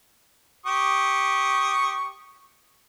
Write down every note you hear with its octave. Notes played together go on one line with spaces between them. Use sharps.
G4 C#6 D#6